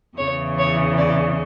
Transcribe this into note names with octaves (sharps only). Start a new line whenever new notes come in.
E2 C#3 E3 C#5
C#5
D5